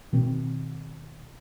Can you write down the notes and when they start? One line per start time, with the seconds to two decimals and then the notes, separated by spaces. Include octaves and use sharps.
0.13 B2 D#3 C4